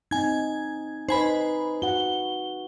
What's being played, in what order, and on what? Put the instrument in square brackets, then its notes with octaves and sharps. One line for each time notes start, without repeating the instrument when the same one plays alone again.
[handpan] C4 D#4 [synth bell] G#5 G#6
[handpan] D#4 B4 [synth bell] C5 G#5 B5
[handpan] F#4 F#5 [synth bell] G7